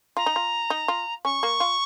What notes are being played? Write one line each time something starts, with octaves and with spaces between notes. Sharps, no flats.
F4 A#5
D#4
F4
D#4
F4
C#4 C#6
A#3
F4